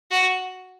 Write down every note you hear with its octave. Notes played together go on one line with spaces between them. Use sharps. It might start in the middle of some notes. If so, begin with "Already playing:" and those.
F#4